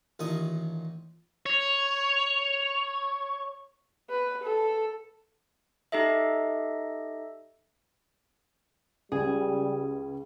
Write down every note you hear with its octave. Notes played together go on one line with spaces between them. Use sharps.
A1 A#2 D#3 C#6 D#6
C#5 F7
B4
A4
D#4 G4 A4 D#5 E5
C#2 G3 G#4